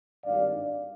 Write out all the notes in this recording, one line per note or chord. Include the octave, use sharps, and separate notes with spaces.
G#1 G2 D#3 D5 F5